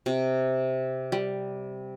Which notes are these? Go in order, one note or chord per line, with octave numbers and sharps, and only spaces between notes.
C3
G3